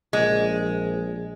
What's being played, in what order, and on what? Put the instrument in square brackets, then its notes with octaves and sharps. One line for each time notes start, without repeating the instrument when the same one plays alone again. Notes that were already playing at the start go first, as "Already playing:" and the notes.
[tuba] A#1 [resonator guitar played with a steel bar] G#3